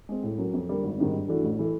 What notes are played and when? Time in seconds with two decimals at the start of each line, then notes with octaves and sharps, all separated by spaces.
0.09 G#3 C4
0.23 A2
0.38 F#3 A#3 C#4
0.53 F2
0.68 D3 G3 A#3
0.83 G#1
0.98 G#2 D#3 G3 C4
1.13 G2
1.28 E3 A3 D4 F#4
1.44 A1
1.59 E3 A3